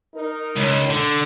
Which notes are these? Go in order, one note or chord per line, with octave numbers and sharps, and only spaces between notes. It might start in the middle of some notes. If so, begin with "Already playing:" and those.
D#4 A#4
C#2
D3